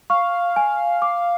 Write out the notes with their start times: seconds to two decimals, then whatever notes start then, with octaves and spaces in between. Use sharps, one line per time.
0.10 F5 C#6
0.56 G#5
1.02 D6